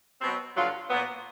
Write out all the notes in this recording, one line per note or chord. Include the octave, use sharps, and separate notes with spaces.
B2 F#3 C4
G2 D3 F#3 F4
A#2 F#3 B3